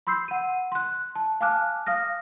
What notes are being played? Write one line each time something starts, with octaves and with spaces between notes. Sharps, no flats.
B5 C6 E6 G6 C7
F#5 D#7
C6 F#6
A5
F5 G#5 A5 D6 F6 F#6
F5 D#6 F6 A#6